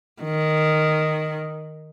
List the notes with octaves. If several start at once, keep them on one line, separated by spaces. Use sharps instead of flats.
D#3